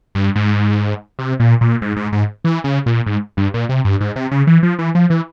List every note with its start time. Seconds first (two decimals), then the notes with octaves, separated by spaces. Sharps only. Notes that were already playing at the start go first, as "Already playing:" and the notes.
0.15 G2
0.36 G#2
1.19 C3
1.40 A#2
1.61 A#2
1.82 G#2
1.97 G#2
2.12 G#2
2.45 E3
2.64 C#3
2.86 A#2
3.06 G#2
3.37 G2
3.54 A#2
3.69 C3
3.85 G2
4.01 G#2
4.16 C3
4.31 C#3
4.47 E3
4.63 F3
4.79 E3
4.95 F3
5.10 E3